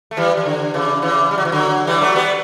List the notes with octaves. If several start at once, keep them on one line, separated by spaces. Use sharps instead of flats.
A3
E3 G3
E3
D3
C#3 E3
C#3 E3
G3
F#3
E3
D3 F#3
E3 G3
F#3 A3
G3 B3